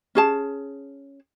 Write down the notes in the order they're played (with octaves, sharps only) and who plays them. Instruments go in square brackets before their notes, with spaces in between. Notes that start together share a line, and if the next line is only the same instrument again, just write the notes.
[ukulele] C#4 G#4 A5